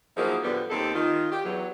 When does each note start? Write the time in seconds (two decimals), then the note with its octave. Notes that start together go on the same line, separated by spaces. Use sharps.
0.17 D#3 F3 F#3 A#3 E4 G#4
0.43 A2 D3 F3 G3 B3
0.70 D#2 C4 G4 A4
0.94 D#3 F4
1.31 G4
1.44 E2 F#3